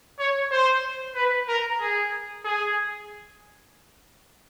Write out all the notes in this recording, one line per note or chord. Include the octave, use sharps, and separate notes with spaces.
C#5
C5
B4
A#4
G#4
G#4